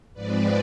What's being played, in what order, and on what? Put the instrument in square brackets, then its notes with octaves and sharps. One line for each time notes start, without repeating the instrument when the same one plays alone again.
[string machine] G#2 F3 G#3 C4 B4 D5